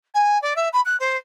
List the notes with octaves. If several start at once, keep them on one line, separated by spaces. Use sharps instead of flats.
G#5
D5
E5
B5
F#6
C5